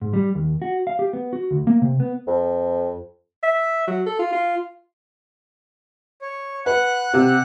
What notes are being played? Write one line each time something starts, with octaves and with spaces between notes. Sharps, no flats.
G#2
G3
D#2
F#4
F5
G4
B3
F#4
D2
A#3
C3
B3
F2
E5
F#3
A4
F4
F4
C#5
B4 F#5 F#6
C3